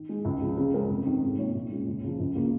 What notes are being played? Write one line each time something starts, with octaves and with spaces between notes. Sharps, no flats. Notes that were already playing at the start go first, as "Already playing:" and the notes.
Already playing: D#3
G#3 D#4
C#2
C#3 F3
C#3
G#3 C#4 A#4
F1
F2 D#3
G#2
D#3 A#3 F4 C#5
A#1
A#2 G#3 C#4
C#2
C#3 F3
C#2
C#3 A#3 F4